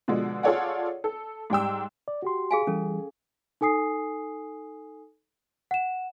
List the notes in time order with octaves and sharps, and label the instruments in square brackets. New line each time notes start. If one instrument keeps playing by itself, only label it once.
[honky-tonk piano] B2 D3 F3 G#3
F4 G#4 A4 C#5 D5 F#5
A4
G#2 G3 G5 E6
[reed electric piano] D5
F#4 G4 C6
[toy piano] G#4 F5 G#5
[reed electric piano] E3 G3 [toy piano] C#4 A4
[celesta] D#4 A4 G#5 D#6 C7
F#5 E7